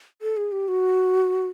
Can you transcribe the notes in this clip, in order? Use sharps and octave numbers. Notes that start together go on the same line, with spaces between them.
A4
G#4
G4
F#4